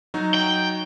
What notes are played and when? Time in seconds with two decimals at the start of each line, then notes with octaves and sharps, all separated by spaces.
0.14 F#3 D#4 F#4
0.34 G5